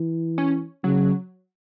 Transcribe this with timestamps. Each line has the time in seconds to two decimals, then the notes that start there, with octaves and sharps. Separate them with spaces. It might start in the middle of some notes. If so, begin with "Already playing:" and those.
Already playing: E3
0.38 C#4
0.84 C#3 F#3